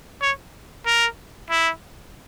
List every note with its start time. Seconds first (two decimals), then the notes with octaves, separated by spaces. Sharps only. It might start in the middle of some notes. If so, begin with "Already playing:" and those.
0.22 C#5
0.86 A#4
1.51 E4